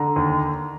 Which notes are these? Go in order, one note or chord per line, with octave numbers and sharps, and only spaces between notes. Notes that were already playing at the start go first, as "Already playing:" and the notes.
Already playing: D3 A#5
D#2